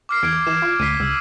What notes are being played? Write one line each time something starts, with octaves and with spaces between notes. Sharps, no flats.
D6 F6 C7
E2 G#6 D7
E3 E7
F4
D2 B6 C7 D#7
C#2 E6